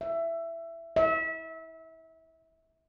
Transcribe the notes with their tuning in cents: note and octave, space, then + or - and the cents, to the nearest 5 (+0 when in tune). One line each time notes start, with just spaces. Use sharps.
E5 +15
E5 -30